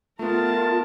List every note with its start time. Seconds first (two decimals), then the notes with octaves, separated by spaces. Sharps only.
0.19 A3 B3 F4 A#4 A5